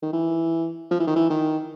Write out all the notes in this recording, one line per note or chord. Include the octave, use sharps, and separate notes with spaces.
D#3
E3
F3
E3
D#3
E3
D#3